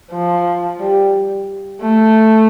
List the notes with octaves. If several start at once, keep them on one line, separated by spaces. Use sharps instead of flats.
F3
G3
A3